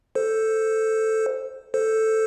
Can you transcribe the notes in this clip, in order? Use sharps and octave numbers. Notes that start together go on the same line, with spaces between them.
A4 C5
A4 C5